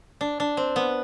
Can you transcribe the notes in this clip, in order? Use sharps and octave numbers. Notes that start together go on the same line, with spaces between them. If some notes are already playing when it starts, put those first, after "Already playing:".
D4
D4
C4
B3